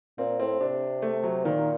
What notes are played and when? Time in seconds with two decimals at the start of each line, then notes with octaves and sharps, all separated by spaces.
0.18 A#2 C4
0.39 A2 C4
0.60 C3 D4
1.02 A3
1.23 F#3
1.45 A#2 D#3